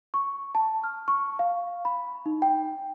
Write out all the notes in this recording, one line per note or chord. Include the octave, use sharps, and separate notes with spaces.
C#6
A5
F6
C#6
F5
B5
D#4
G5